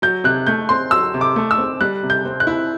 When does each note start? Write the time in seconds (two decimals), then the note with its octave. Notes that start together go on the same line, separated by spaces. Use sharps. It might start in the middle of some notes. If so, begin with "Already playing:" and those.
0.02 F#3 G6
0.24 C3 F#6
0.47 A3 G6
0.69 C4 C6
0.91 F#3 E6
1.14 C3
1.21 D6
1.36 A3
1.51 E6
1.58 C4
1.81 G3 F#6
2.03 C3
2.10 G6
2.25 C4
2.40 F#6
2.47 E4